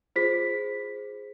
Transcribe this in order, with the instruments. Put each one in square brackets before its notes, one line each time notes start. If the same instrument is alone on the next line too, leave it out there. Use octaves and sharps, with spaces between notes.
[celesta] F4 G#4 C5 B6